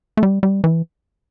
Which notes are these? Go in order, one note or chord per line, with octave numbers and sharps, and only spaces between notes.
A3
G3
G3
E3